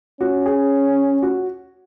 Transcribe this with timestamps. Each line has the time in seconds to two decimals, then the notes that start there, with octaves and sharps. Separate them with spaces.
0.21 C#4 F#4
0.46 G#4
1.23 F#4